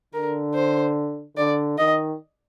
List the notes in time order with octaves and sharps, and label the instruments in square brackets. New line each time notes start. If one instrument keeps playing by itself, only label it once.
[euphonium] D3 [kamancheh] A#4
[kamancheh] C5
[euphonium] D3 [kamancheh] D5
[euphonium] D#3 [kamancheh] D#5